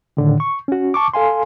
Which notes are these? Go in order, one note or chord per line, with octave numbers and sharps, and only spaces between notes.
A2 D3 D#3
C#6
C#4 F#4
A5 C#6 D6
A4 F5 G#5 C6